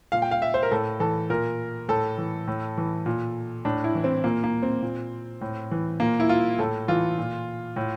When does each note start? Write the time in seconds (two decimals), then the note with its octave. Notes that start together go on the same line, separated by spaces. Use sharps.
0.12 A#2 F5
0.22 G5
0.31 F5
0.42 E5
0.54 C5
0.63 A#4
0.71 A2 A4
1.00 E3 A4
1.30 A#2 A#4
1.88 A2 A4
2.18 E3
2.47 A2
2.77 E3
3.06 A#2
3.65 A2 D4
3.84 E4
3.95 E3
4.04 C4
4.24 A#2 A#3
4.44 A#3
4.62 C4
4.82 A#2
5.41 A2
5.71 E3
6.00 A#2 A#3
6.20 E4
6.29 F4
6.59 A2 A4
6.88 E3 F4
7.18 A#2
7.76 A2